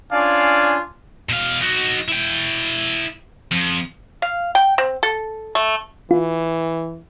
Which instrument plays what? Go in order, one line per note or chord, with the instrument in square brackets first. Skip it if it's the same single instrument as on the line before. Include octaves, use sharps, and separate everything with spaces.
[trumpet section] C#4 D4 F4 D5 F5 G#5
[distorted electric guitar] B2 F5
D#4 F#4
E4 G5
F2
[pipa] F5
G5
C4
A4
A3
[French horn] E3 [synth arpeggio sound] F4